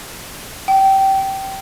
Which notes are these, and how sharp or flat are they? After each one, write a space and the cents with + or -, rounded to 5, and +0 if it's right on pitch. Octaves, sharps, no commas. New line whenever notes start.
G5 -20